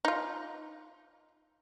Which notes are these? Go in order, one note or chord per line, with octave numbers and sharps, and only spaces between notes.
D#4 F4